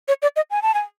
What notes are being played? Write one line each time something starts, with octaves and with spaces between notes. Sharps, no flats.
C#5
D5
D#5
G#5
A5
G#5